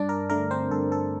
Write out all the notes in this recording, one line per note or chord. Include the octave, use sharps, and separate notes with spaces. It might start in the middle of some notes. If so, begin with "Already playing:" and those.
Already playing: G2 D4 D5
A#4
D3 A3 A#4
C4 C5
G2 A4
A4